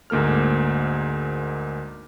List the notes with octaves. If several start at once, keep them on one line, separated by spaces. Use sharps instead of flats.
D2 G#2 A#3 A4 F6